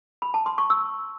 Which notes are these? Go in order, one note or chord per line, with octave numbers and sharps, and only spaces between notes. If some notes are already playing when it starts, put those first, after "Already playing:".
B5
A5
C6
C#6
E6